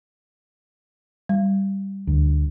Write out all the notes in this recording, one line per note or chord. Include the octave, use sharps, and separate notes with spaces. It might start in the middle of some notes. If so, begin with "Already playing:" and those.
G3
D2